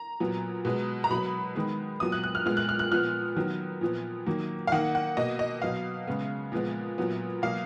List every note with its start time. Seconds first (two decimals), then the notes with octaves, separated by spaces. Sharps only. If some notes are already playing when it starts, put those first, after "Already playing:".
Already playing: A#5
0.20 A#2 F#3 B3
0.65 B2 G#3 B3
1.04 A#5
1.10 B2 F#3 B3 B5
1.55 D#3 G#3 B3
2.00 A#2 F#3 B3 D#6
2.12 F#6
2.24 F#6
2.35 F6
2.45 A#2 G#3 B3 F6
2.57 F#6
2.69 F6
2.79 F#6
2.91 A#2 F3 B3 F6
3.36 D#3 F#3 B3
3.81 A#2 F3 B3
4.26 D#3 F#3 A#3
4.67 F5
4.72 D#3 A#3 F#5
4.95 F#5
5.17 B2 A#3 D#5
5.39 D#5
5.62 B2 F#3 B3 F5
6.07 C#3 G#3 B3
6.52 A#2 F3 G#3 B3
6.98 A#2 F#3 B3
7.42 B2 F#3 A#3 F5